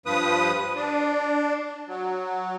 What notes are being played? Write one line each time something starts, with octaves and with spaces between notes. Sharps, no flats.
G2 F3 B4 D#6
D4
F#3